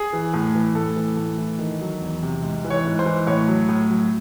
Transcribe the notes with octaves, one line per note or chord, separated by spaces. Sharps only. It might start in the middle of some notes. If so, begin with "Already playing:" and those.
Already playing: G#4
E3
A2
E3
A2 A4
E3
A2
E3
D#3
F#3
E2
C3
G#2
E3
C#5
G#2
C5
E3
A2 C#5
F#3
A2
F#3